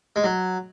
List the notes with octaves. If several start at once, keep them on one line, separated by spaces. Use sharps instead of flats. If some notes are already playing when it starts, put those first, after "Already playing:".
G#3
F#3